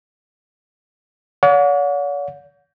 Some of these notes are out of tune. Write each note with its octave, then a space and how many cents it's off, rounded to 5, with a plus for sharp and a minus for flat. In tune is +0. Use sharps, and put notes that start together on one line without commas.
C#5 +45 F#5 -40